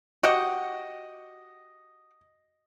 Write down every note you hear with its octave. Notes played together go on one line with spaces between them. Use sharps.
F#4 G4 D#5 F#5